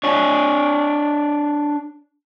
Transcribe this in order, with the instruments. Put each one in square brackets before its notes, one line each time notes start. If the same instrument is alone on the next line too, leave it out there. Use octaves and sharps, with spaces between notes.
[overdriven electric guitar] D4 C#5